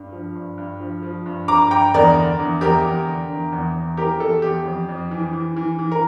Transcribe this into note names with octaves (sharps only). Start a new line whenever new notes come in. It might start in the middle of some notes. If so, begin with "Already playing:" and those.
Already playing: G2
F3
G2
G2
F3
F3
G2
G2 A#5 D6
G2 G5 A#5
E2 A#4 D5
D3
E2
E2 G4 A#4
E2
D3
E2
E2
E2
E3 G4 A#4
E2 A4
E2 G4
F2
F2
E3
E3
E3
E3
A#4